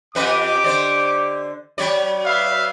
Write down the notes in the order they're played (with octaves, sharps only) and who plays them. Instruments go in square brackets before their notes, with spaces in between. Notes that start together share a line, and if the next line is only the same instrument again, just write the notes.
[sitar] F2 B4 D#5 [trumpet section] G4 D6
[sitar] D3 C5 D5
F#3 C#5 D5
[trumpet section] B4 E5 F5